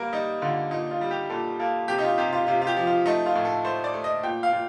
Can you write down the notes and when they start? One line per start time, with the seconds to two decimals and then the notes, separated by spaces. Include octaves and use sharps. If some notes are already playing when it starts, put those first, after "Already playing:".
Already playing: G3 A#3 A#4
0.13 G3 D#4
0.42 D3 F4
0.71 A#2 D#4
0.91 F4
1.01 G3
1.11 G4
1.30 A#2 A4
1.59 A#3 A4
1.88 C3 G4
1.99 D#4
2.04 F4
2.18 C3 G4
2.32 F4
2.47 C3 F4
2.62 F4
2.67 G4
2.76 F3
2.87 F4
3.06 A3 D#4
3.26 F4
3.35 A2
3.45 A4
3.64 A3 C5
3.84 D5
3.94 A3
4.04 D#5
4.23 A#2 G5
4.43 F5
4.53 A#2